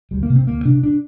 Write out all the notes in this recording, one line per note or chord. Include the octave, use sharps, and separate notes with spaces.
D2 G3
A#3
C3
C4
D2 A#3
C3 D4
D4